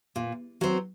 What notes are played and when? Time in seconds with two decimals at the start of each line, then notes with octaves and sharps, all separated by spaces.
0.16 A#2
0.61 F#3 C4